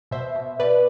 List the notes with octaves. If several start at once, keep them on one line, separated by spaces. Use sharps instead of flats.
B2 C5 E5
B2
B2 B4 D5